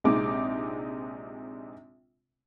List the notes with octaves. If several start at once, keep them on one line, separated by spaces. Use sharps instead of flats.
A#1 C3 G#3 D#4 D6